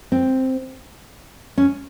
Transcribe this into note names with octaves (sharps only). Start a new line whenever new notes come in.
C4
C#4